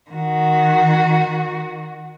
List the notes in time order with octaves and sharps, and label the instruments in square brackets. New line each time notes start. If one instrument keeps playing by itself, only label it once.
[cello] D#3 F#4